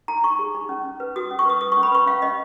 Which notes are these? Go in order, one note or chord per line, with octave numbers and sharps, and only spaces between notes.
D#4 A#5
D#4 C#6
G#4
D#4
C#4
C#4
B4
F#4 D#6
C#4
C#6
B4 D#6
B4 D#6
C#6
C#4
B5
B4 C#6
C#4 F5
C#4 D#5